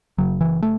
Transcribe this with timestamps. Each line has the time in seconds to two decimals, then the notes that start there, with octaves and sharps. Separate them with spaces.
0.18 F#1 F#2 C#3 F#3
0.41 E3
0.62 A3